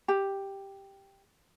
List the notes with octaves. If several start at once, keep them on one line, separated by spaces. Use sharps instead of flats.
G4